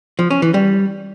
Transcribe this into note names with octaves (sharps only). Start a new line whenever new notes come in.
F3
C#4
E3
G3